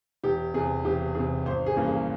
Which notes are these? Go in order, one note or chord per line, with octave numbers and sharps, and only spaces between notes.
E1 G4
E2 C3 G#4
E1 G4
E2 C3 G#4
G#1 C5
G#4
G2 E3 A#3 C#4
G#4